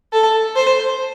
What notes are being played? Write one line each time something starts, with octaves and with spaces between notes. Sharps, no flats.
A4
C5